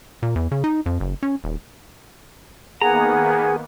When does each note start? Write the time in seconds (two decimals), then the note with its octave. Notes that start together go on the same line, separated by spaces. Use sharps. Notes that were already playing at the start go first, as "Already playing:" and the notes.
0.23 A#2
0.36 E2
0.52 C#3
0.64 D#4
0.86 F2
1.00 F#1
1.23 C#4
1.44 D#1
2.81 D#3 A#3 B3 G#4 F#5 A#5